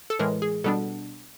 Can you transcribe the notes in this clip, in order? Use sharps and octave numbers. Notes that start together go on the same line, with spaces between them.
A4
A2 E3 G#3 A#4
G#4
B2 G3 B3 D4 A4